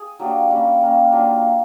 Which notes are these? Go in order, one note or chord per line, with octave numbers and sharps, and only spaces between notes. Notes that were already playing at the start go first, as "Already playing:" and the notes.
Already playing: G#4
F#3 A#3 D4 G4
G3 A#3 C#4
G3 A#3 C#4
F#3 A#3 D4 F4